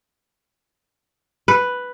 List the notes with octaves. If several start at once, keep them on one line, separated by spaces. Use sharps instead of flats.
B4